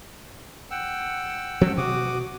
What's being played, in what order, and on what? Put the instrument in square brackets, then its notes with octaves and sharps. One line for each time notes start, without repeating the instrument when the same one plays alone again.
[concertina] F#5 G5 E6
[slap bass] F3 G#3 C#4
[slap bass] B2 [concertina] F#4 D6 D#6